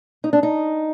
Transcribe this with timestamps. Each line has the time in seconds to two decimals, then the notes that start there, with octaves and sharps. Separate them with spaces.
0.24 D#4
0.33 D4
0.43 D#4